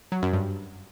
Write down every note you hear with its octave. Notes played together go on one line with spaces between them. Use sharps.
F#3
F#2
G2